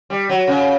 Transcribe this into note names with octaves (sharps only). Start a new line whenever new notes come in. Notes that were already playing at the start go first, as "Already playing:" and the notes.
G3
F#3
C#3